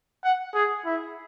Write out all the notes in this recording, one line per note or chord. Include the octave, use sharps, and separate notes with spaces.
F#5
G#4
E4